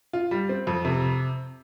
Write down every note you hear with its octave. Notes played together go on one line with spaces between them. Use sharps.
F4
G3
C4
F2
C3